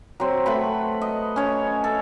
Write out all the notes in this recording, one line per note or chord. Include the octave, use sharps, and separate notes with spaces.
F#3 C4
A3 B4 B5
D#5
C#4 C#5
A4